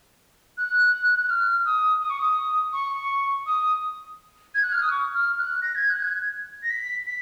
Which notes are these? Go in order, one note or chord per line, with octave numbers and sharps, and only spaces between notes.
F#6
F#6
F6
D#6
D#6
C#6
D#6
C#6
D#6
G#6
F#6
F6
D#6
C#6
F6
F#6
A#6
G#6
F#6
G#6
A#6
B6
B6